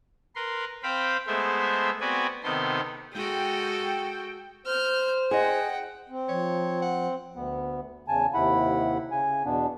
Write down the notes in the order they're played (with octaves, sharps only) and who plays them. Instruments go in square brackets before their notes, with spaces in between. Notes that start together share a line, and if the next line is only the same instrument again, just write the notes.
[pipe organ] A#4 B4 C6
C4 C5 F5 G5 B5
G#3 A3 B3 C5 E5
B3 C4 F#4 B4 D5 G#5
C3 D#3 B3 A4 C6
[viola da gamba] G#3 F#4 A4 [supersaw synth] G5
[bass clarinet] C5 [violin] F6 G6
[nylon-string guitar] G#4 D#5 [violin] F#5 G5
[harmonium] C4
[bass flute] F3 [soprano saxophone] C#5
[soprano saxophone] F#5
[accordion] D2 B3
E2 C#3 G#5 A5
D#2 C3 E4 F#5 B5
C#3 G#5
E2 B2 B3 D4